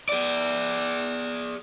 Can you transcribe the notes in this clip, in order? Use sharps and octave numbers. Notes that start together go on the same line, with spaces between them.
G#4 D5